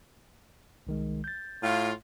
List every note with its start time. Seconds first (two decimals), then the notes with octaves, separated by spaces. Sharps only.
0.87 C2 D#3 G#3
1.24 G6 A6
1.63 A2 F4